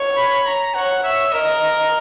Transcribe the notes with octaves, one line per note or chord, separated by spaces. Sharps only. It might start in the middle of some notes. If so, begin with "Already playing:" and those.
Already playing: C#5
B5
A#5
C#5 F#5
C#5 E5
A#4 D#5